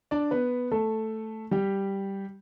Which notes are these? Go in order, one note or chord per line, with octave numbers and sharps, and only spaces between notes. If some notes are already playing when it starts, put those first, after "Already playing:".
D4 D5
B3 B4
A3 A4
G3 G4